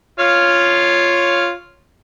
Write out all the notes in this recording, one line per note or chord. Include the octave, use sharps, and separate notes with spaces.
F4 C#5 F5